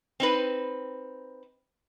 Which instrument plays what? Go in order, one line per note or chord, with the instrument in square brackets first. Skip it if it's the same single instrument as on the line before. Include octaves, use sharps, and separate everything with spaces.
[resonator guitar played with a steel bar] C4 D#4 B4